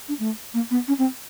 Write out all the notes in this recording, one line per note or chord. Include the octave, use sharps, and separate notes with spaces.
D4
A3
A#3
B3
C#4
C4